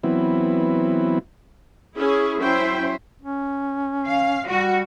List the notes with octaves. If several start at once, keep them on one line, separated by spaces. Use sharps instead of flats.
E3 F#3 B3 C4 E4
C#4 E4 G#4
F#3 C#4 E4 C5 E5 G5
C#4
F5
G3 F#4